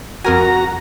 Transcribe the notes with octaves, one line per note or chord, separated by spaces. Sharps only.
F2 F#4 A#4 G#5 A#5